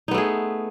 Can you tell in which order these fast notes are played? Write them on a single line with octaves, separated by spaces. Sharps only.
D#4 B3 A3 G#4